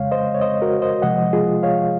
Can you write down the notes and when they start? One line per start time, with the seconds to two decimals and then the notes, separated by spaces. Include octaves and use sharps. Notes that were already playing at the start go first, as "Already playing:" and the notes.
Already playing: F2 C#3 G#3 C#5 F5
0.11 C5 D#5
0.34 C#5
0.41 C5 D#5
0.62 F#4 A#4
0.82 C5 D#5
1.02 C3 F3 G#3 D#5 F#5
1.33 F4 G#4
1.63 C#5 F5